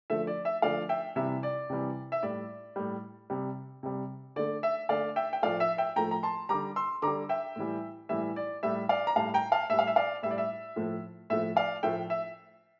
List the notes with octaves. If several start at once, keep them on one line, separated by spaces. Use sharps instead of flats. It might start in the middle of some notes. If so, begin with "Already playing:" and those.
D3 F3 A3 E5
D5
E5
D3 F3 A3 D5 F5
E5 G5
C3 E3 G3 E5
D5
C3 E3 G3
E5
A2 G3 D5
A2 G3
C3 G3
C3 G3
D3 A3 D5
E5
D3 A3 D5 F5
E5 G5
G5
A2 F3 A3 D5 F5
E5
E5 G5
A2 F3 A3 G5 A#5
A#5
A5 C6
D3 G3 A#5 D6
C6 E6
D3 G3 A#5 D6
E5 G5
A2 E3 G3
A2 E3 G3 E5
D5
A2 G3 E5
D5 F5
A#5
A2 G3 F5 A5
G5 A#5
F5 A5
A2 G3 E5
F5
E5
D5 F5
A2 G3 E5
D5
E5
A2 F3 A3
A2 F3 A3 E5
D5 F5
A2 F3 A3 E5 G5
E5